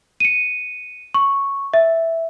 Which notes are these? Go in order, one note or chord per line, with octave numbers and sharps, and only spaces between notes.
C#7 D#7
C#6
E5